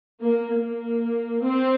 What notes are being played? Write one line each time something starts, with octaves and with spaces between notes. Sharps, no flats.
A#3
A#3
C4